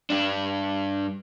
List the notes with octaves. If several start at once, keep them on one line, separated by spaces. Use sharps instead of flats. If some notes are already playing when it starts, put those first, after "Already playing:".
G2 D4